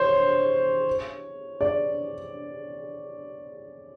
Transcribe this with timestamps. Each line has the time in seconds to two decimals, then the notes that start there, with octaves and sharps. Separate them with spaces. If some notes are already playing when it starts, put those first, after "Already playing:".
Already playing: C5 C#5
1.61 D5